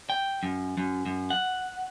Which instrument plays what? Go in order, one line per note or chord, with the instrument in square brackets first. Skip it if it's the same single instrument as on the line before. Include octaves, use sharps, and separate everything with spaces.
[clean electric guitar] G5
F#2
F#2
F#2
F#5